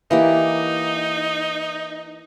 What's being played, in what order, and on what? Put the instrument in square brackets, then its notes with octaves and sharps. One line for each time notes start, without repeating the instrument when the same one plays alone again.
[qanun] E3 A#3 G4 [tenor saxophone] D#4